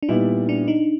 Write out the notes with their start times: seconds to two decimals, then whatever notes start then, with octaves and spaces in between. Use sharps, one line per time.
0.03 D4
0.09 A#2 G3 B3 D#4 E4
0.49 D4
0.68 D#4